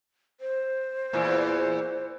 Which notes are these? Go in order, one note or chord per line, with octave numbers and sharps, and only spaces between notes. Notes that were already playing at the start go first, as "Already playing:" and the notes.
C5
E2 A#2 E3